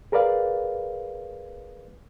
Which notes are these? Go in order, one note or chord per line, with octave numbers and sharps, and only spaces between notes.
G#4 A#4 B4 D5 F5